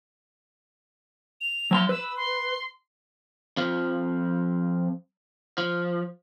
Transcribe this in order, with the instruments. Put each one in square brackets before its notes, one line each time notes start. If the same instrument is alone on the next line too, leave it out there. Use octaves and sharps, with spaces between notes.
[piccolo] F7
[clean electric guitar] F#3 G#5 C6
[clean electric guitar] B4 [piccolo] E6
[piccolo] C6
[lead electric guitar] F2 F3
F3